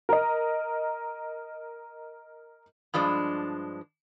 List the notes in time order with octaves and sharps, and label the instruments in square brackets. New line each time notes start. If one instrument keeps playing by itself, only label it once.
[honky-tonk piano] A#4 D#5
[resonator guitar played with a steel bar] G2 F3 G#3 D4